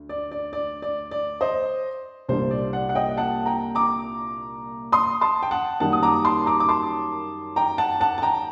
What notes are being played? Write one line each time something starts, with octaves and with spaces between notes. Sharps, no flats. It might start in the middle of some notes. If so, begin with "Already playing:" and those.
Already playing: D2
D5
D5
D5
D5
D5
C5 D#5
C2 A#2 G3 D4 C5
D5
D5 F#5
F#5
D#5 G5
F#5 A5
G5 A#5
A#5 D6
C6 D#6
A5 C6
G5
F#5 A5
F#2 D#3 G3 A#3 F#5 A5
D#6
A#5 D6
A5 C6
A#5 D6
D6
A5 C6
G5 A#5
F#5 A5
F#5 A5
A5
G5 A#5